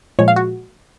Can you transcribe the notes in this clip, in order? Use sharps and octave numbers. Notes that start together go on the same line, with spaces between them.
A#2 F3 G#3 C#5
F5
F#4